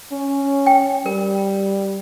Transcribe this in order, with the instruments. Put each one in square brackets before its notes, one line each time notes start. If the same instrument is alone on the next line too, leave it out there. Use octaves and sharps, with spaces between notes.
[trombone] C#4
[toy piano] G5
[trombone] G3 [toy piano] A#4